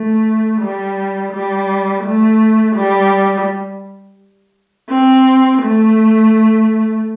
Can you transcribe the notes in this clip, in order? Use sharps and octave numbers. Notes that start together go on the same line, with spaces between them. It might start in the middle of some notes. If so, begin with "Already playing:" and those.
Already playing: A3
G3
G3
A3
G3
C4
A3